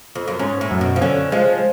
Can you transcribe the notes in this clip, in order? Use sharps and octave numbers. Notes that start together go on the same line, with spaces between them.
F2
F#2
G#2 C#4
A2
F#2
B2
F3
D3 C#4
F3 G#3